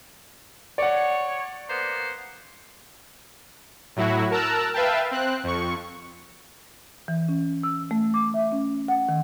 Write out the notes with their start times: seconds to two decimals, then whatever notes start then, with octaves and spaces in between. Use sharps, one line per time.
0.78 C#5 D5 F#5
1.69 A#3 B3 C5
3.96 A2 F#3 E4 F#4
4.31 A#4 A5 A#5 E6 F#6
4.73 B4 E5 F5 G5 A5
5.11 C4 F#6
5.44 F2 C#6
7.08 E3
7.28 C#4
7.63 E6
7.91 A3
8.14 D6
8.34 E5
8.52 C#4
8.88 F#5
9.09 D#3